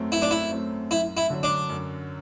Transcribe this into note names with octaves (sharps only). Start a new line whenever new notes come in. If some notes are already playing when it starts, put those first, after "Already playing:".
Already playing: F#2 F#3 A3 C4
F#2 E4
D4
E4
F#3 A3 C4
F#2 E4
E4
D3 F#3
D4
F#2